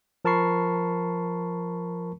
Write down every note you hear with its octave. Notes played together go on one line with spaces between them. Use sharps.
F3 A#4 A5 B5 C#6 C7